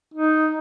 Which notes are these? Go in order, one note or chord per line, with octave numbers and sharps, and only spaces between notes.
D#4